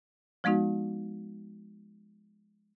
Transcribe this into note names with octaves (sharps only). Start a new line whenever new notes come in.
F3 G#3 B3 D#4 F#4